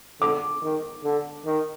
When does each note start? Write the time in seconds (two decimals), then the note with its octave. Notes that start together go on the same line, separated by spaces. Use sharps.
0.21 D3 D6
0.63 D#3
1.04 D3
1.45 D#3